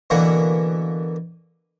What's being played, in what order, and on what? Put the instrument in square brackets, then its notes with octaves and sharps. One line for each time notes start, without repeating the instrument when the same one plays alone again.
[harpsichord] B2 D3 E3 A#3 F#5